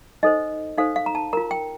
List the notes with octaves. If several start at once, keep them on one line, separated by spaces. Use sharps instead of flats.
D#4 A4 C5 D#5
D#4 A4 C5 F5
F5
A#5
A5
F4 A#4 A#5
G5